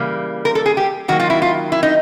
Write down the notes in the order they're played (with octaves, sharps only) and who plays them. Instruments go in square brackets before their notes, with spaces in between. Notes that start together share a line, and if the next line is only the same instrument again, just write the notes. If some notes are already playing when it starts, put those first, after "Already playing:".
Already playing: [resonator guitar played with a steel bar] C#3 E3 G3 A#3
A#4
A4
G#4
G4
D#3 F#3 A#3 F#4
F4
E4
F4
E4
D#4